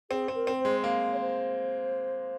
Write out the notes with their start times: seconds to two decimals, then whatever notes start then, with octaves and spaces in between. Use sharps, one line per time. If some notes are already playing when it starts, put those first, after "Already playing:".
0.11 C4 G#4
0.28 C4
0.35 A#4
0.47 C4
0.59 C5
0.65 G#3
0.84 A#3
1.13 C#5
1.20 C5